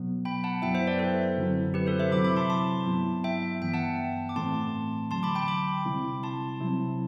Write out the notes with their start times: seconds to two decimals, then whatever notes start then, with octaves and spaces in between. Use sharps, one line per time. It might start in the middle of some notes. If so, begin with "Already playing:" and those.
Already playing: B2 F#3 B3
0.25 G5 B5
0.44 F#5 A5
0.62 F#2 F#3 B3 E4 E5 G5
0.75 C5 E5
0.87 B4 D5
0.99 A4 C5
1.37 F#2 D3 F#3 C4 E4
1.74 G4 B4
1.86 A4 C5
2.00 C5 E5
2.11 C3 F#3 C4 E4 B5 D6
2.25 B5 D6
2.36 A5 C6
2.50 A5 C6
2.86 G2 F#3 B3 E4
3.24 E5 G5
3.62 G2 E3 B3 E5 G5
3.74 F#5 A5
4.29 D6
4.36 A2 E3 A3 C4 A5 C6
5.10 E2 D3 F#3 A5 C6
5.23 B5 D6
5.35 G5 B5
5.48 B5 D6
5.85 C3 G3 C4 E4
6.23 A5 C6
6.60 C3 F#3 C4 E4